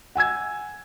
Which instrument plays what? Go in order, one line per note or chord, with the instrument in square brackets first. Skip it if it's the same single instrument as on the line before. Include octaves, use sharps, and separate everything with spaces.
[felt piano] F#5 G#5 E6 G#6